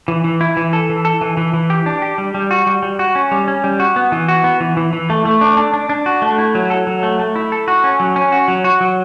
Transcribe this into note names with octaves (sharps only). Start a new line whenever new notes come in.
E3
E3
E4
E3
A4
E3
A4
E3
E3
E3
G4
D4
G4
G3
G3
F#4
G3
G3
F#4
C#4
G3
C#4
G3
F#4
B3
E3
F#4
B3
E3
E3
E3
A3
A3
D4
D4
D4
D4
F#4
A3
E4
F#3
A4
F#3
A3
A3
E4
A4
F#4
C#4
F#3
C#4
F#4
F#3
F#4
F#3